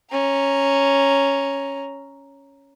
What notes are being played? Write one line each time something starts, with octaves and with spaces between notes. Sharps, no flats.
C#4 A#5